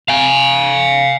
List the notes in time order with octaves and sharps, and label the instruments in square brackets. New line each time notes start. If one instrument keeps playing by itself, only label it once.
[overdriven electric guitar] F5 G#5